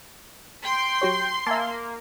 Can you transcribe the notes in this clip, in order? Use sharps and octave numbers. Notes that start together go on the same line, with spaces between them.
G5 C6
F#3 G4 C#5
A#3 E5 G#5 A5